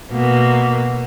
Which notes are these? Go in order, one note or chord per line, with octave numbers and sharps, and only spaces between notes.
B2 A#3